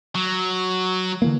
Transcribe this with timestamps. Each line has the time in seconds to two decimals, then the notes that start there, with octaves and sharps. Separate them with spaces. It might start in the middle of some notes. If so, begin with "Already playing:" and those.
0.15 F#3
1.22 D3 E3 A#3